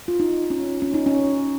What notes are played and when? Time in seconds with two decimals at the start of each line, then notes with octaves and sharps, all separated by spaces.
0.08 F4
0.20 D#4
0.50 C#4
0.82 C#4
0.94 D#4
1.06 C#4